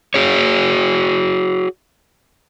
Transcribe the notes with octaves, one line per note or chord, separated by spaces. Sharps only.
F#4 G#4 C#5